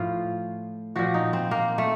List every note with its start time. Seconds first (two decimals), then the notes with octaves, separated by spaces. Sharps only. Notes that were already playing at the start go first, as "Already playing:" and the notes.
Already playing: A2 F3 F4
0.96 A#2 F3 F#4
1.14 D#4
1.33 C4
1.51 A#3
1.78 A3